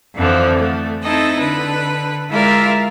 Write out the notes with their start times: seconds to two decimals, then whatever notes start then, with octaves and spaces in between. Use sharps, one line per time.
0.15 F2 D3 E3 F3
0.58 A3
1.03 C4 D#4 E4 A4 D#5
1.40 D3 B4
2.30 G#3 E4 F4 A#4 D5 E5